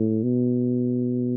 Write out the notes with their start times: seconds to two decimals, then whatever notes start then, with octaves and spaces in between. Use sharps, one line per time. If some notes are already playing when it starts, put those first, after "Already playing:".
Already playing: A2
0.23 B2